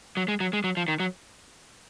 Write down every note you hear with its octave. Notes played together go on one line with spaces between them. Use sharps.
F#3
G#3
F#3
G#3
F#3
F3
D#3
F#3